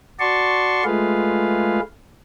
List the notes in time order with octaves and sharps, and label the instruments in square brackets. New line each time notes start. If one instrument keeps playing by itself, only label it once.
[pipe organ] F#4 D5 A5 C6 C#6
G#3 A3 F4 G#4 B4 F5